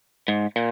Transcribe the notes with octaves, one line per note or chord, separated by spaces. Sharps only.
G#2
A#2